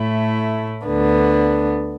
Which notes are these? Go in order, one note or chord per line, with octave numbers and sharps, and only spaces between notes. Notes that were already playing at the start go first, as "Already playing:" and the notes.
Already playing: A2 A3 E4
D2 D3 B3 D4